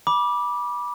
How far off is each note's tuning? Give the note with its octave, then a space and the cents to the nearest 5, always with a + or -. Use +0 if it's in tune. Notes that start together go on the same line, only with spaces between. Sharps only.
B5 -25 D6 +0